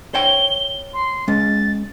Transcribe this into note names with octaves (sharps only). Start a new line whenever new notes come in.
C5 C#5 G5 G7
C6
G#3 C#4 A6